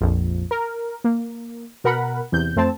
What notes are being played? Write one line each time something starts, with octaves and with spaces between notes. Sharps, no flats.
A#1 F2
A#4
A#3
B2 A#4 F#5 B5
E2 C3 G6
F2 A3 C4 A5